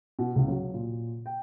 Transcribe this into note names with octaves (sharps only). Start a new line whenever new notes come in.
B2
C#2
F#3
A#2
G5